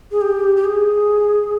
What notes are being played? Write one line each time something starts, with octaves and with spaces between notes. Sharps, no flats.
G#4
G4
G4
G#4